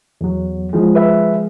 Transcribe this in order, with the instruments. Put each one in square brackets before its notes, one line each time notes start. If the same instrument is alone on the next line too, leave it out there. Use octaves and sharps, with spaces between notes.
[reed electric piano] E2 F#3
[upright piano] F3 G#3
[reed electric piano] B4 E5